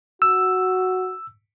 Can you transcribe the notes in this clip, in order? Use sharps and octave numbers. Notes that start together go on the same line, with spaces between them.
F#4 E6